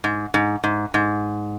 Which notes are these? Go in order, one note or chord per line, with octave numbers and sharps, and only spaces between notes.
G#2
G#2
G#2
G#2